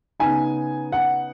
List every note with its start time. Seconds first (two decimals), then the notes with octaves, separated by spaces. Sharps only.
0.20 C#3 B3 D#4 G#5
0.92 F#5